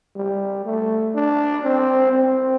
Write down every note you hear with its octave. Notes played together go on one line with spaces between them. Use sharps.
G3
A3
D4
C4
C4